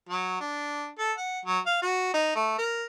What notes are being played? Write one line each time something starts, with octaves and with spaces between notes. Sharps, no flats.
F#3
D4
A4
F#5
F#3
F5
F#4
D#4
A3
A#4